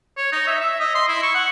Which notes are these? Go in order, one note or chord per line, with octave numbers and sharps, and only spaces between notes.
C#5
D#4
E5
E5
D#5
C6
E4
C#6
F#5